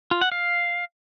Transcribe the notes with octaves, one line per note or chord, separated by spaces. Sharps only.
F4
F#5
F5